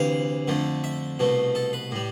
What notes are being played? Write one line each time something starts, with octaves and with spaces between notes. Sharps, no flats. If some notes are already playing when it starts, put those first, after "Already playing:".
Already playing: D2 C3 E3 G3 F5
F2 D3 A3
E5
C2 B2 A3
A4
B4
A2 G3